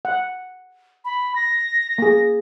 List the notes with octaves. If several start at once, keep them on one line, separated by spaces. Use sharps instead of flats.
F#5
B5
A#6
A#3 G#4